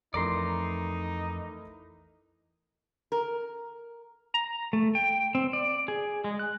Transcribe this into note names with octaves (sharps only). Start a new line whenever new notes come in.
F2 E3 A3 D#4 A#4 D5 A#5 C6
A#4
A#5
A3
G5
C4
D5
G#4
G#3
F#6